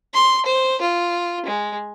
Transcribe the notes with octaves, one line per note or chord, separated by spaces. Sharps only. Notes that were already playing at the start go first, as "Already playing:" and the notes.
C6
C5
F4
G#3